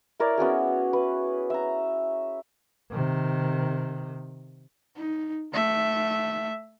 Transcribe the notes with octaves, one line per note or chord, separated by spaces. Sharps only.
E4 A#4 C#5 D5
B3 C#4 F#4 G#4
B4
E5 A#5
C3 D#3
D#4
A3 E5